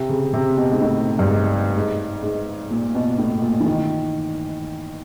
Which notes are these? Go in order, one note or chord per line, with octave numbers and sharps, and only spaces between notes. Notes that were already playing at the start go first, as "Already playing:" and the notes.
Already playing: C3
C#3
C3
B2
G#2
A2
G2
G#2
G#2
G#2
A#2
B2
A2
A#2
E3
D#3